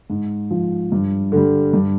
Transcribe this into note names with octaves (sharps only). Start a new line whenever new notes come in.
G#2
F3
G2
D3 G3
G2